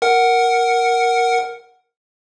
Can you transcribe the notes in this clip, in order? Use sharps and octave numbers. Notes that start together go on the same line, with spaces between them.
A#4 F#5